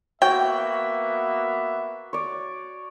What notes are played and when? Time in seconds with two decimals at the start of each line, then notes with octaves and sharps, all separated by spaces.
0.22 A#3 B3 F#4 E5 G5
2.13 C#5 D5